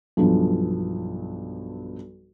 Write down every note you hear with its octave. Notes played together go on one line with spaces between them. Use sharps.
B1 G2 F3